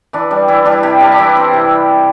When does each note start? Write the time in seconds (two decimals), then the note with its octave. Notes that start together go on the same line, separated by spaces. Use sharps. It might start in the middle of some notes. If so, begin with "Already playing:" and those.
0.13 E3 D4
0.31 G3 D4
0.48 E3 E4
0.65 G3 D4
0.72 E4
0.83 C3 G4
1.00 G3 D4
1.12 D4
1.18 E3 E4
1.36 C4
1.53 C3